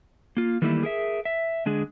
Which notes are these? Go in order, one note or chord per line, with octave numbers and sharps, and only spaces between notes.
A#3 F4
D#3 E3 G3 A3 A#3 E4
G#4 A#4 E5
E5
D3 G#3 D4 G#4